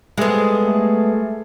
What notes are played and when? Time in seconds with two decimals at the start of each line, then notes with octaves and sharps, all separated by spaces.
0.18 G3 G#3 B3 G#4 A4
0.66 A3